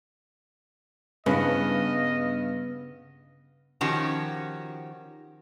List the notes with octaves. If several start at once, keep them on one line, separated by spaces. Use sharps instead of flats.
G2 C#3 B3 E4 B4 D#5
D#3 F3 C#4 F#4 G4